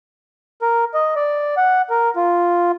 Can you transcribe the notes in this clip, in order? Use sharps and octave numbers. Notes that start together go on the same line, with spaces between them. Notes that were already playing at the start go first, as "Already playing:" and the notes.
A#4
D#5
D5
F#5
A#4
F4